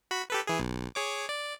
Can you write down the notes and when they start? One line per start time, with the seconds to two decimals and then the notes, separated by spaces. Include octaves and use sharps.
0.11 F#4 B5
0.30 G4 A4 B4
0.47 E3 G#4
0.59 B1
0.95 G#4 C#5 D6
1.29 D5